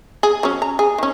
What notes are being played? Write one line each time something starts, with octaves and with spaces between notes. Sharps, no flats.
G#4
F#3 C#4
A#5
G#4
D#3 C#4